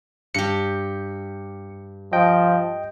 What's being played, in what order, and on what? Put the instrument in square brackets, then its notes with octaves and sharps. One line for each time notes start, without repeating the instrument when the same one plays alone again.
[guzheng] G2 G4 [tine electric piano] C#7
[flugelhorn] F3 [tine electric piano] D#5 G5